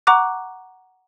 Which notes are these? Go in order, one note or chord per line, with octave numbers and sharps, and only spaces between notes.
F#5 A#5 C#6 D6 F#6